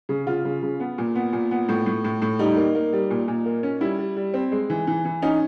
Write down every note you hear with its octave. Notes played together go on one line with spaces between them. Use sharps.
C#3
C#3 F4
C#3
C#3
B3
A#2
B3
A#2
B3
A2
A2
A2
A2
G3 D#4
A#3
A#3
G3
A#2
A#2
A#3
C#4
G3 E4
G3
G3
C4
G#3
E3
E3
E3
C#4 D#4